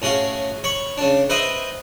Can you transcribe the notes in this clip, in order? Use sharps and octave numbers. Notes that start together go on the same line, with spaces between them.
A2 C#4 F#4 G#4 F5
C#5 B5 C#6
C#3 D4
B4 C5 D#5 E5 G5 B5